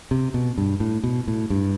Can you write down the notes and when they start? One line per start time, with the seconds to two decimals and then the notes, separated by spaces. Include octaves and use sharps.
0.11 C3
0.34 B2
0.58 G2
0.80 A2
1.03 B2
1.27 A2
1.50 G2